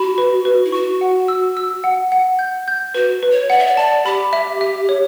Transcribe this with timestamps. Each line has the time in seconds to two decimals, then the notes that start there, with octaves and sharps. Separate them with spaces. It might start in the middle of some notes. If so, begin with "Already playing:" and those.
Already playing: F#4 B5
0.18 B4
0.45 B4
0.65 E4
0.72 F#4 C#6
1.01 F#5
1.28 E6
1.57 E6
1.84 F#5
2.12 F#5
2.39 G6
2.68 G6
2.94 F#4 B4
3.23 B4
3.32 C#5
3.50 D5 F#5
3.59 E5
3.67 D5
3.77 D5 A5
4.06 G4 B5
4.33 E5
4.61 E5
4.89 C#5